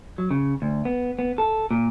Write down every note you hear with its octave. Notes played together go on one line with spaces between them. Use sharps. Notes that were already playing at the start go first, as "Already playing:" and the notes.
F#3
C#3
D2
B3
B3
A4
A#2